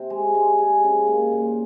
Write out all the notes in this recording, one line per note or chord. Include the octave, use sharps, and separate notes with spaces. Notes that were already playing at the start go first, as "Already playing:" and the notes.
Already playing: C3 C4
G#3
G#3
G#4
C#3
A#3
A#2